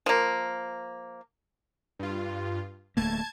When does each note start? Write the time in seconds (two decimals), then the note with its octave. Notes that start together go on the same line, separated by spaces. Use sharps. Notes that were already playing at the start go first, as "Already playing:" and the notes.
0.06 F3 A#3
1.99 G2 F4
2.97 D1 A3 A#3 A5 G#6